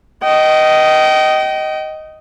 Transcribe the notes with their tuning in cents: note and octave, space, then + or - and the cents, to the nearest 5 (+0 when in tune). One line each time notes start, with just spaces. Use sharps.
D#5 +5 G5 -30